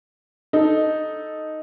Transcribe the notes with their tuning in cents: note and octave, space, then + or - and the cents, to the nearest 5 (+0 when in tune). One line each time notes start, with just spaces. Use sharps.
D#4 +0 A4 -5